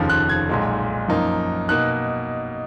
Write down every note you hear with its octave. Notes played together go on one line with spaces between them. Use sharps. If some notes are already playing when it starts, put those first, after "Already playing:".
Already playing: F1 D#2 C#3 F3
F#6
G#6
B1 A#2 G#3
F#2 F3 A#3 D#4
B2 A#3 D#4 F#6